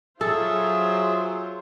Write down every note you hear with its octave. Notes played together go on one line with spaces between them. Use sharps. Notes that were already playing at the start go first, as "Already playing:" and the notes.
F#3 F4 G#4 A4 C5 E5